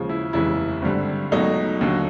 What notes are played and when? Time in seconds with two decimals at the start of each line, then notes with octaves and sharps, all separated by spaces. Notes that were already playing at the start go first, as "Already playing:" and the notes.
Already playing: D#2 C#3 F3 G#3
0.09 E4
0.33 F1 D#2 C#3 E3 G#3 E4
0.82 G#1 G2 D3 G3
1.31 C#2 B2 F#3 A3 D#4
1.81 D#2 D3 F#3 A3